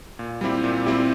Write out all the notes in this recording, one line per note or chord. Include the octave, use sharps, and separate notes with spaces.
A#2
G3 C4 E4 G4
A#2
G3 C4 E4 G4